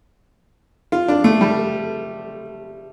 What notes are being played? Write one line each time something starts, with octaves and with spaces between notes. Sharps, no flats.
F4
D4
A3
G3